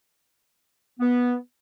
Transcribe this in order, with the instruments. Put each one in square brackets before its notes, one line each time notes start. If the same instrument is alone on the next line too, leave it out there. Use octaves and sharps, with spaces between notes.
[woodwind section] B3